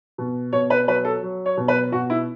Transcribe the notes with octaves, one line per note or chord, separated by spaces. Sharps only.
B2
B2 C#5
B4
F#3 B4
A4
F#3
C#5
B2
B4
B2 F#4
E4